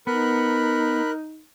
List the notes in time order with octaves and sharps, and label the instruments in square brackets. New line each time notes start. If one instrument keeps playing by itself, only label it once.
[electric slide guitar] B3 [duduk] D#4 [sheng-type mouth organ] A#4 F#6 [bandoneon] B5